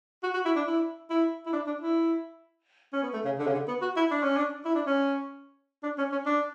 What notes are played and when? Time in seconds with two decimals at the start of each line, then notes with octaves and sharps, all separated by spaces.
0.23 F#4
0.34 F#4
0.45 E4
0.56 D4
0.67 E4
1.10 E4
1.46 E4
1.53 D4
1.67 D4
1.82 E4
2.93 C#4
3.03 B3
3.13 A3
3.25 C#3
3.39 D3
3.47 C#3
3.54 D3
3.68 B3
3.82 F#4
3.97 E4
4.11 D4
4.23 C#4
4.37 D4
4.65 E4
4.75 D4
4.86 C#4
5.83 D4
5.98 C#4
6.12 C#4
6.26 D4